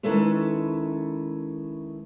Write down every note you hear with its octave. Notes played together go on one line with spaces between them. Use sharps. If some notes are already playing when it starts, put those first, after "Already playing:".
D#3 G#3 C#4 E4 A4 B4